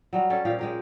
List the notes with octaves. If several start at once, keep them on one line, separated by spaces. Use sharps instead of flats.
F#3 G3 F#4
G3 C#4 A4
A#2 F3 G4 F5
G#3 G4 A#4